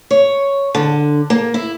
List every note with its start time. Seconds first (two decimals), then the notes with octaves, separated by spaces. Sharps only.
0.11 C#5
0.75 D3
1.30 A#3
1.54 E4